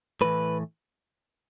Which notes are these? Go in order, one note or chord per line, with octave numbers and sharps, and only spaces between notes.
A2 E3 B4